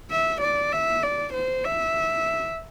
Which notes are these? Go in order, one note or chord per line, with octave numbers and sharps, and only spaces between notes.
E5
D5
E5
D5
C5
E5